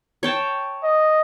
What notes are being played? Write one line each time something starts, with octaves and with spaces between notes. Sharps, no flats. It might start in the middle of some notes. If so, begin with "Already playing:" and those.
C#5 G5 A5
D#5